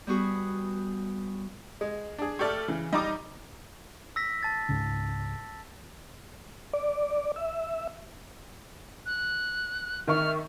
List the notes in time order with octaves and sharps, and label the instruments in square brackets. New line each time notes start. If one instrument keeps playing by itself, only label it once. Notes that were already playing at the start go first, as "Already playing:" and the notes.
[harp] G3 B3 F#4 G#4
[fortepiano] G#3
D4 G#4
[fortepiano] A3 D5 C#6 [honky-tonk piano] G4 A4 F6
[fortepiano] C#3 [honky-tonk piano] E3
[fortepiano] G3 D#4 G4 [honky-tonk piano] D#5 A#5 D6
[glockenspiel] E6 A#6 B6
A5 A6
[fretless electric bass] C#2 G#2 C#3
[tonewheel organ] D5
E5
[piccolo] F#6
[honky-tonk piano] D#3 E5 C#6 [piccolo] F6